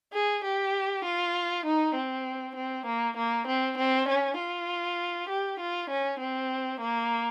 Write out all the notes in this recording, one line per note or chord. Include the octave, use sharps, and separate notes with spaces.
G#4
G4
F4
D#4
C4
C4
A#3
A#3
C4
C4
C#4
F4
G4
F4
C#4
C4
A#3